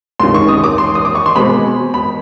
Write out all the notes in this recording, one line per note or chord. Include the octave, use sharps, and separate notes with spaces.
C#2 C3 D#3 C6
C#6
D#6
D6
C6
D#6
D6
C#6
C6
B2 G#3 C4 B5
B5